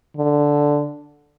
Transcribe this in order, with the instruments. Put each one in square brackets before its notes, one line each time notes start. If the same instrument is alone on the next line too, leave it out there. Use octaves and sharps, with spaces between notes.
[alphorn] D3